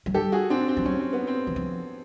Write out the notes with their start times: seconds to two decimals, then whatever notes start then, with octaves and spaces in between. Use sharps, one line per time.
0.06 F#3
0.14 G3 G4 A4
0.32 F#4 G#4
0.50 C4 D4
0.68 C4
0.77 F3
0.85 F#3 C#4
0.99 C4
1.13 B3
1.27 C4
1.47 E3
1.56 F3